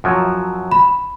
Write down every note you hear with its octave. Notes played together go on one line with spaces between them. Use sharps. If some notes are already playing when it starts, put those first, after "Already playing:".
F#2 F3 F#3
B5